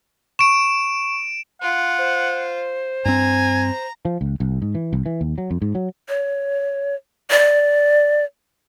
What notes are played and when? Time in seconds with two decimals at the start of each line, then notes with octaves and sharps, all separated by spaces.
0.39 C#6 D7 E7
1.61 F4 F#5
1.98 C5
3.05 G2 C4 G#5 A#5
4.05 F3
4.21 C#2
4.40 C2
4.62 G#2
4.75 E3
4.93 C2
5.06 E3
5.21 D#2
5.38 F#3
5.51 F2
5.62 G#2
5.75 F#3
6.09 C#5
7.31 D5